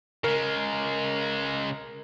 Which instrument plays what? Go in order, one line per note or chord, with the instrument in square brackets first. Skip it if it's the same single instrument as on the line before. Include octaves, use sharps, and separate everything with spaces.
[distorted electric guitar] C#3 G#3 [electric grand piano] A#4